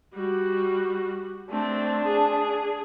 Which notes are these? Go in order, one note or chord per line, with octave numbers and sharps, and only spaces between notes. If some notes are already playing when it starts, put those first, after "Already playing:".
G3 F#4
A3 C4 D4
G#4